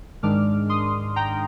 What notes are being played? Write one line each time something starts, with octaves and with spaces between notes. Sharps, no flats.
G#2 D#3 G#3 D4 D6 F6
C6 D#6
G5 A#5